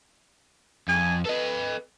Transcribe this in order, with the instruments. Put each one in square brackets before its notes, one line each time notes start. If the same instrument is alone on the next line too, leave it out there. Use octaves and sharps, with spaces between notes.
[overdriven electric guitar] F2 [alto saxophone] G#5
[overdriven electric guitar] A4 D#5 [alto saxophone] B4